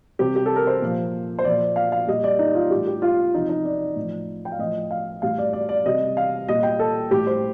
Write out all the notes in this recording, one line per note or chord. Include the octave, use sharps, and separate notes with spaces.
C3 G3 G4
G4
A4
A#4
C5
A#2 F3
C5
A#2 F3 D5
F5
F5
A#2 G3 D#5
D5
D#4
F4
A2 G3 G4
G4
F4
C3 F3 D#4
D#4
D5
A2 F3
G5
F5
A2 F3 D#5
F5
A2 G3 F5
D5
D5
D5
C3 G3 D#5
F5
A#2 G3 D#5
G5
A4
A2 G3 G4
C5